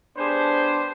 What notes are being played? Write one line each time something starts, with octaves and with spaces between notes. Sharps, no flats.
B3 D4 G4 G#4 C5